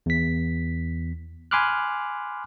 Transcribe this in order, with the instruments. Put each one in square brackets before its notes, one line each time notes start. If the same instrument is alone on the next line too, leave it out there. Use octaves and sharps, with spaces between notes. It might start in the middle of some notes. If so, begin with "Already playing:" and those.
[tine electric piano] E2 B6
G#5 B5 C6 D6 F6 F#6